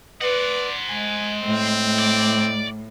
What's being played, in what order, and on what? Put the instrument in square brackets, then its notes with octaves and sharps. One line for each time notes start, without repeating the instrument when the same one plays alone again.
[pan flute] B4 [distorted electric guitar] C5 F#5 [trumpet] D5
[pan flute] G#3 [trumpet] G#5
[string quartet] A2 [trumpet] C4
[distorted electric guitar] D5